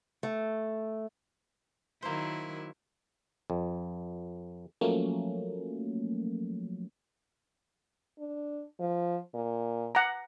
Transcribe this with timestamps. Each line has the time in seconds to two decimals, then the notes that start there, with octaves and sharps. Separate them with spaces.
0.23 A3
2.02 D#3 F#3 A#3 E4 C5
3.50 F2
4.81 F3 F#3 A3 A#3 C#4
8.19 D4
8.80 F3
9.34 A#2
9.95 F#5 A#5